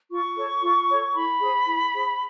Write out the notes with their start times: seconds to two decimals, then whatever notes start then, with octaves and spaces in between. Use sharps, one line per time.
0.10 F4 C#6
0.36 A4 C#5
0.62 F4
0.89 A4 C#5
1.15 E4 B5
1.41 G#4 C5
1.67 E4
1.93 G#4 C5